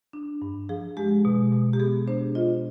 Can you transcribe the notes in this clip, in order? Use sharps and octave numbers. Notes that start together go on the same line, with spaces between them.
D4
G2
F3 G#4
G#3 G4
B2
B2
G4
B3 G#4
D4 C5
F4 D#5